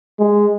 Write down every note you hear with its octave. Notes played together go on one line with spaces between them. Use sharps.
G#3